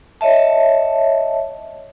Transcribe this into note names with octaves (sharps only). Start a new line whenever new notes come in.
C#5 D#5 E5 A5